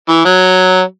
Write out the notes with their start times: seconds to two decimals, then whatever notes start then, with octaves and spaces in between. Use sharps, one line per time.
0.09 E3
0.25 F#3